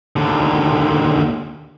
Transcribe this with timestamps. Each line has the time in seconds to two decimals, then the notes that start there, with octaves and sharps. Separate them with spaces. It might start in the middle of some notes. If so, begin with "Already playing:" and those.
0.16 D#2 D3